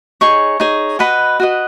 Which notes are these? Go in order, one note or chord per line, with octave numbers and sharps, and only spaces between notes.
D#4 G#4 C#5 C#6
D#4 G#4 C#5
F#4 B4 D#5 B5
F#4 B4 D#5